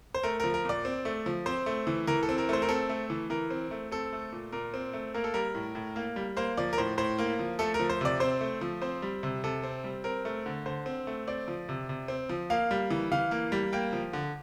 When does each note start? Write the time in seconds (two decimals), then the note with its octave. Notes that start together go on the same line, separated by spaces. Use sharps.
0.14 C5
0.23 A3 A#4
0.40 F3 A#4
0.54 A#4
0.65 A#2 D5
0.85 C4
1.05 A3
1.26 F3
1.46 C4 C5
1.66 A3
1.87 E3
2.07 E3 A#4
2.23 A4
2.29 C4
2.38 A#4
2.49 A3 C5
2.62 A#4
2.69 C4 A4
2.89 A3
3.10 E3
3.30 E3 A#4
3.50 C4
3.71 A3
3.92 C4 A4
4.13 A3
4.32 A#2
4.52 A#2 A#4
4.74 C4
4.93 A3
5.14 A#3 A#4
5.24 A4
5.34 G3 A#4
5.55 A2
5.75 A2
5.96 A#3
6.16 G3
6.37 A#3 C5
6.57 F3 D5
6.73 A#4
6.78 A2 C5
6.98 A2 C5
7.19 A#3
7.39 F3
7.59 A3 A4
7.74 A#4
7.79 F3
7.90 C5
8.01 C3 D5
8.20 C4 C5
8.41 A3
8.61 F3
8.82 C4 C5
9.02 G3
9.23 C3
9.44 C3 A4
9.64 C4
9.84 G3
10.04 C4 A#4
10.25 A3
10.46 D3
10.66 D3 C5
10.86 C4
11.07 A3
11.28 C4 D5
11.48 F3
11.69 C3
11.89 C3
12.08 C4
12.29 F3
12.50 A#3 F5
12.71 G3
12.90 E3
13.12 E3 F5
13.31 A#3
13.52 G3
13.73 A#3 G5
13.93 F3
14.13 D3